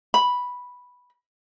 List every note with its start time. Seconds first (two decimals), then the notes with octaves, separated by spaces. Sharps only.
0.14 B5